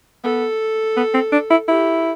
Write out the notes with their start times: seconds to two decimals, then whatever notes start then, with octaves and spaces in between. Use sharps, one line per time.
0.24 B3 A4
0.97 B3
1.14 C4
1.32 D4
1.51 E4
1.68 E4 G4